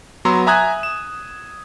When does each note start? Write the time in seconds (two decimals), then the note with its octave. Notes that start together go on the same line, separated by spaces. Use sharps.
0.25 F#3 B3 A#5 C6 E6
0.47 E5 G#5 A#5 D#6 F#6 G#6
0.83 E7